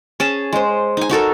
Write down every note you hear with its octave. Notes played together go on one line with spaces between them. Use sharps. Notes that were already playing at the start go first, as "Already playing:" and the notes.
C#4 G#4 A5
G#3 C5
D#4 G#5
D#4 F#4 A4 A#4